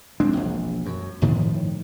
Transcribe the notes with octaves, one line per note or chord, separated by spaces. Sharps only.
G#3 C4 D4
E1 A#1
F#2
G1 A2 D#3 F3